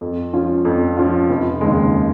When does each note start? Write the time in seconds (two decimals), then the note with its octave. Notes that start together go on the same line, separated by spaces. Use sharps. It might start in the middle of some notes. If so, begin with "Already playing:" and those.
0.01 F2
0.33 F3 C#4 F4
0.65 F2
0.97 F3 C#4 F4
1.29 F1
1.61 D#2 C#3 G#3